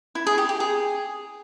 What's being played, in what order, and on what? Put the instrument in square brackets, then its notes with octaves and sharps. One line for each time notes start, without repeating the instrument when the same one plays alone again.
[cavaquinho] E4
G#4
G4
G4
G#4